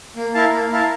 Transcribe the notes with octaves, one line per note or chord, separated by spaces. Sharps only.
A#3
E4 A#4 F5 A5
A#3
E4 A#4 F5 A5